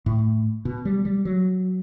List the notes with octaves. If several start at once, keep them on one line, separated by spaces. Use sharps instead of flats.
A2
B2
G3
G3
F#3